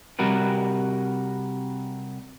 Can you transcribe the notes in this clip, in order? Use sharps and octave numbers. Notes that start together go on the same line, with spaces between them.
C3 G3 F#4 A#4 B4